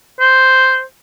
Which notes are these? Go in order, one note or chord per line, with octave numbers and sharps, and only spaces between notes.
C5